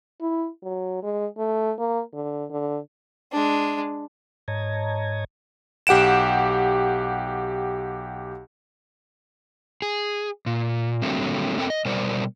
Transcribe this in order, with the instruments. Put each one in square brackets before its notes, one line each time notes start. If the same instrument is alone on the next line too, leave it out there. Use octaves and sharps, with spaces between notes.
[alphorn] E4
F#3
G#3
A3
A#3
D3
D3
[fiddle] G#3 D4
[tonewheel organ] G#2 C#5 D#5 A5 A#5 G#6
[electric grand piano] B1 G4 F#5 D7 E7
[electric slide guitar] G#4
A#2
D3 F#3 G3 A3 A#3 C4
C4 A4 A#4 G5
D#5
B2 G3 A#4 C5 D5